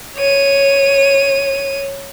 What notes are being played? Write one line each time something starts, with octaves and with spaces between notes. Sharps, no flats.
C#5 D#7